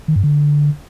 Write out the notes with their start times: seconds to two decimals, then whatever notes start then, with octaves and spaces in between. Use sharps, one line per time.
0.08 D#3
0.16 G2
0.23 D3